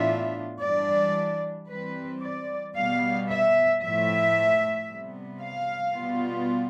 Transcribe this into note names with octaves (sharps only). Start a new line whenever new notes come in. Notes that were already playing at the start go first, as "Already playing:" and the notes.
Already playing: A2 E3 B3 D4 F4 E5
E3 G3 D4 D5
E3 G3 C4 B4
D5
B2 G3 B3 F5
E5
A2 F3 A3 E5
C3 G3 B3
F5
B2 G3 B3 F4